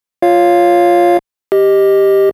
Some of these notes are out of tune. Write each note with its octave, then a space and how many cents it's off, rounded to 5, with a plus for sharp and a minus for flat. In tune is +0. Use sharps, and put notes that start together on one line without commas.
F4 +0 C#5 +0 F5 +0
G4 +0 D#5 -5